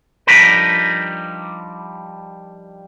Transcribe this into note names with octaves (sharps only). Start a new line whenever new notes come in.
F3 G3 D4 D#4 A#4 B4